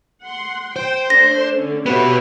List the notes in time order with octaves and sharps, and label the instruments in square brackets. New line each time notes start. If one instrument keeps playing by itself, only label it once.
[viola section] F#5 C6
[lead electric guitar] C5 [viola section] G5
[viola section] A3 D4 [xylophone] A#6
[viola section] D3 C#4
[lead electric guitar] B3 F#4 [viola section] G4 C#5 E5 [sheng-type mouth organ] B4